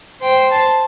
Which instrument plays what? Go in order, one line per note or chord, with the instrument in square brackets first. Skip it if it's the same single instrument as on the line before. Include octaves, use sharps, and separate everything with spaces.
[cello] C5 [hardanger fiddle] G5
[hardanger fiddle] A5